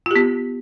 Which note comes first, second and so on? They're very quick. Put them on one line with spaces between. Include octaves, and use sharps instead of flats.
F4 G4 B3